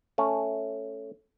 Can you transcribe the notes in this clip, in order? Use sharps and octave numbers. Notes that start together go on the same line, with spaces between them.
A3 C#4